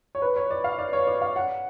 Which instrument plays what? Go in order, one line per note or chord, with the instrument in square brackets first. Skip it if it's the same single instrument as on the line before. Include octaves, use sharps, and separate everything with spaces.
[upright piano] C#5
B4
C#5
D5
F5
D5
C#5
D5
F5
F#5